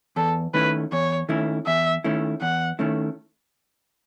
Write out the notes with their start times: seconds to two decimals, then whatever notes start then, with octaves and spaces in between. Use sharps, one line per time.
0.16 E2 A4
0.54 D#3 A3 C#4 E4 B4
0.92 E2 C#5
1.29 D#3 A3 C#4 E4
1.66 E2 E5
2.04 D#3 A3 C#4 E4
2.41 E2 F#5
2.79 D#3 A3 C#4 E4